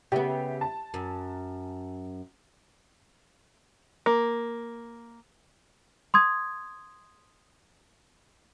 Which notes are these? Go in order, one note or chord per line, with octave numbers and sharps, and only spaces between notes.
C#3 B3 G4 E5
A5
F#2
A#3
C6 D#6 G#6